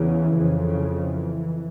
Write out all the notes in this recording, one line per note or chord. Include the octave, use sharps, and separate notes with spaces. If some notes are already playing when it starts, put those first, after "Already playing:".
Already playing: E2 C#3 E3
F2
C#3
C#3
E3